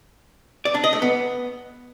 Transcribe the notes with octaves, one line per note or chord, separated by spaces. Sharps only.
D5
D4
D#5
A3
B3